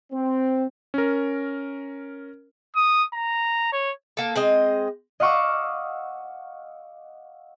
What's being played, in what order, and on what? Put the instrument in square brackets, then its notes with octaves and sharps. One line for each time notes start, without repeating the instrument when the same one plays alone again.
[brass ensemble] C4
[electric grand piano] C#4 A#4
[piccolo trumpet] D#6
A#5
C#5
[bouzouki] A#3 A4
G#3 C4 D#5
[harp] D#5 F5 F#5 C#6 D6 E6